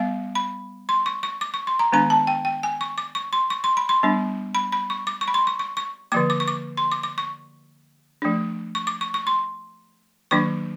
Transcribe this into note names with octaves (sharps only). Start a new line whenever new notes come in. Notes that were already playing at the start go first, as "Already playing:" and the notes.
Already playing: G3 B3 F5
B5
C6
C#6
C#6
D6
C#6
C6
A#5
D#3 G#3 B3 D4 A#5
A5
G5
G5
G#5
C#6
D6
C#6
C6
C#6
C6
B5
C6
G3 B3 D4
B5
B5
C#6
D6
C#6
B5
C6
C#6
C#6
C#6
D3 F3 A#3 D6
D6
C#6
D6
C6
D6
D6
C#6
F3 A3 D4
C#6
D6
C#6
C#6
C6
D#3 F#3 A#3 D4 C#6